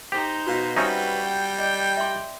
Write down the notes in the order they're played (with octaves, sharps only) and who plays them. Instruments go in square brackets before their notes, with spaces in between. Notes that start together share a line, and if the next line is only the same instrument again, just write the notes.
[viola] D#4 C5 [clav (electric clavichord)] G4
[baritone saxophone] B2 [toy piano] F#4 F5
[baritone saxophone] G3 [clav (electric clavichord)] C4 C#4 D#4 [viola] F#4 B4 [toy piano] E5
[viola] G5
[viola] D5 G5 [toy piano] D#5
[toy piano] E5 C6